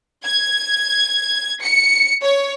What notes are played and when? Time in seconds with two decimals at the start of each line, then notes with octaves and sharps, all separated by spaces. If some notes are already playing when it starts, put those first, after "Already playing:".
0.25 G#6
1.62 C#7
2.23 C#5